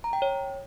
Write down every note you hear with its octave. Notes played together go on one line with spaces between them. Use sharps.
A#5
G5
C#5